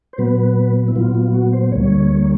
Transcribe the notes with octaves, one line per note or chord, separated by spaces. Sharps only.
C5
A#2 F#3 B3 B4
E4
A#2 F#3 B3 F4
F4
F#4
C5
D2 D3 G3 A#3 C#5